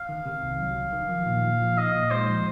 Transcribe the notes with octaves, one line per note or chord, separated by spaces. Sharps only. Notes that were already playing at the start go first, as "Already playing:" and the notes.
Already playing: F5
D#3
C3
C2
F#3
D#3
D#3
F3
A#2
A#2
F3
D#4 D#5
A#2
G#3 C5
F3